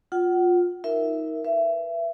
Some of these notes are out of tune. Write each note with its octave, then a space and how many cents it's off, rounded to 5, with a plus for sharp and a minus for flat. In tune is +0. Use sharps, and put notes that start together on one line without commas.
F4 +15 F#5 +30
D#4 +25 A#4 +0 E5 +0
B4 +0 E5 +25